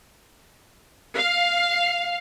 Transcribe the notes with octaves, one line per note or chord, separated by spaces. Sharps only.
F5